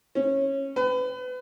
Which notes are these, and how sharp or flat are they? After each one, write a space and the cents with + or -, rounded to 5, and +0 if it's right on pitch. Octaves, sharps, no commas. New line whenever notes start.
C#4 -20
B4 +30